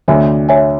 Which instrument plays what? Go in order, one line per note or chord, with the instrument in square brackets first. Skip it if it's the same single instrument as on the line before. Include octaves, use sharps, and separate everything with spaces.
[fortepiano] D2 D3 [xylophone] C#5 E5 G#5
[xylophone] C#5 E5 G#5